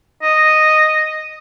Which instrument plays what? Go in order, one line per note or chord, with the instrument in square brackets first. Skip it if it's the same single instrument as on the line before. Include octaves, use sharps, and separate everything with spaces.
[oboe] D#5